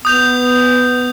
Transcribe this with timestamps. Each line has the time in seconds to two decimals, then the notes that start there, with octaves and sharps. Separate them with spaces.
0.05 B3 D#6 G6 F7